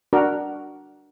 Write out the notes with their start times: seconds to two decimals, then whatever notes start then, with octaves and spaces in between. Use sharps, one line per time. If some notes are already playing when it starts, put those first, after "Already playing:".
0.13 D4 F#4 A#4